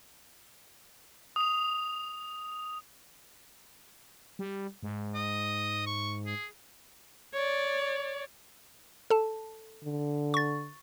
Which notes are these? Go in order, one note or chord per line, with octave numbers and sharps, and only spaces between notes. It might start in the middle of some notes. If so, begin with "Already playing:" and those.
D#6 F7
G3
G#2
D#5
C#6
G#4
C#5 D5
A4 A5
D3
C#6 A6